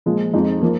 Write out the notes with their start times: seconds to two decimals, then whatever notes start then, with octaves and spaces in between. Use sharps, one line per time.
0.06 A#2 F3 G#3
0.34 F2 F3 G#3 D#4
0.62 F3 A#3